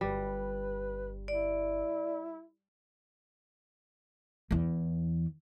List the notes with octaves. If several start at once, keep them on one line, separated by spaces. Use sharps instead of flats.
G1 G3 B4
E4 D5
E2 E3